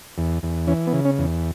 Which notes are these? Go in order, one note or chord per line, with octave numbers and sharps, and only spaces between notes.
E2
E2
E3 C#4
B3
C#3
C#4
E2